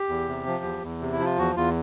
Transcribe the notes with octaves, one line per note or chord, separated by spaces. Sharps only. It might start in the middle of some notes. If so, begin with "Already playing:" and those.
Already playing: G4
E2
C3
F3
E2
E2
C3
E4
F3
F4
E2 F#4
E2 F4